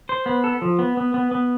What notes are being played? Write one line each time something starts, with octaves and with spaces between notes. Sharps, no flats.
C5
B3
A4
F3
B3
B3
B3
B3